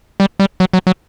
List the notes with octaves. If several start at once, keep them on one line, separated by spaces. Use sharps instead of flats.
G3
G3
F#3
F#3
F#3